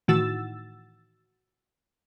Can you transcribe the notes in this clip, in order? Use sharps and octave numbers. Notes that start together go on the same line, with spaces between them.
A2 D#3 E3 F#4 E6 A6